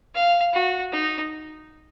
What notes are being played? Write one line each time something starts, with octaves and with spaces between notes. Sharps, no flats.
F5
F#4
D#4